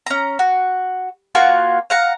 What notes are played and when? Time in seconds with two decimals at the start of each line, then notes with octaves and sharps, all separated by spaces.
0.06 C#4 A#5
0.39 F#4
1.35 A#3 F4 F#4 G#5
1.90 F5 F#5 A#5